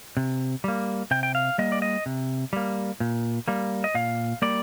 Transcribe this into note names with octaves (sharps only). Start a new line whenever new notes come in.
C3
G3 A#3
C3 G5
G5
F5
G3 A#3 D#5
D5
D#5
C3
G3 A#3
A#2
G3 A#3
D#5
A#2 F5
G3 A#3 D5